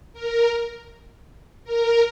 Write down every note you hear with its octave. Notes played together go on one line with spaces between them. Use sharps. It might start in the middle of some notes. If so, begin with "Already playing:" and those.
A#4
A#4